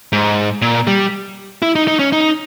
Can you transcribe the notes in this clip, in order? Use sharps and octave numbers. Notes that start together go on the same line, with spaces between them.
G#2
A#2
G3
E4
D#4
D#4
C#4
D#4